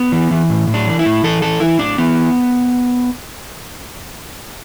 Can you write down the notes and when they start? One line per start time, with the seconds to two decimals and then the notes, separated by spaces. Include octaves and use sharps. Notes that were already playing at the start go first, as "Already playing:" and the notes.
Already playing: B3
0.12 E3
0.31 E3
0.50 A2
0.67 A2
0.74 D4
0.87 E3
0.99 E4
1.06 A2
1.24 E3 A4
1.42 E3 A4
1.60 E3 E4
1.79 A2 D4
1.98 E3 B3